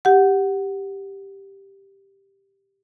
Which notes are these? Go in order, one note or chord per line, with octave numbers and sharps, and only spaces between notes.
G4 F#5